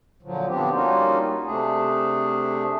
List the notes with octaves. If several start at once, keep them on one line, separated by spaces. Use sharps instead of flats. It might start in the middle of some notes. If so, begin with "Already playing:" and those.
A#2 D3 F3 F#3
D3 F3 B3 C4 D4 G4
G3 A#3 C#4 D#4 F4 F#4
C3 A3 D4 G#4